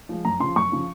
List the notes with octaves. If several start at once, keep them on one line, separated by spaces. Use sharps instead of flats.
F3 G#3
F#2 A#5
C#3 F3 C6
F#2 C#6
C#3 F3